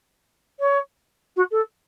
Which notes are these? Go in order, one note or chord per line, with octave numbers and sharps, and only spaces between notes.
C#5
F#4
A4